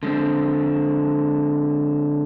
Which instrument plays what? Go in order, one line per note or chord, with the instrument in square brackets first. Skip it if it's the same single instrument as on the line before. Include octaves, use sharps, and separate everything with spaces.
[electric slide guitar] D3 G#3 C4